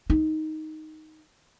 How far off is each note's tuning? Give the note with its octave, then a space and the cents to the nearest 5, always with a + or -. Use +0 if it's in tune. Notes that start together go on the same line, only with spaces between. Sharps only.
D#4 +5